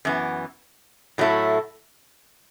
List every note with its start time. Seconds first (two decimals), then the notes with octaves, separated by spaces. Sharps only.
0.05 F#2 E3 B3
1.18 A2 F#3 A3 E4